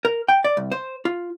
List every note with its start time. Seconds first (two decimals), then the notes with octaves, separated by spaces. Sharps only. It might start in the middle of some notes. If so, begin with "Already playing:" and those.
0.05 A#4
0.28 G5
0.44 D5
0.57 C2
0.72 C5
1.05 F4